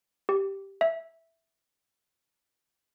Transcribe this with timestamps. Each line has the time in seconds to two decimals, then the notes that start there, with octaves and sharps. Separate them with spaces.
0.29 G4
0.81 E5